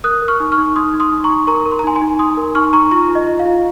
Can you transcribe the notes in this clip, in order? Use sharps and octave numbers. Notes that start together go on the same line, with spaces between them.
A#4 D#6 F#6
A#4
C#6 F6
D#4
C#6 F6
D#4
D#4 C6 D#6
D#4
C6 D#6
D#4
A#5 C#6
D#4
A#4 A#5 C#6
A#4
C6
A#5
D#4 G#5 C6
G#5 C6
D#4
D#4 C6 D#6
A#4
D#4 C#6 F6
D#4 A#5 C#6
F4 A#5 C#6
F4
D#5
F4
F5
F4